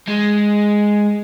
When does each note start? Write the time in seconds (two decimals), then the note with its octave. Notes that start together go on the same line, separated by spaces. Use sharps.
0.08 G#3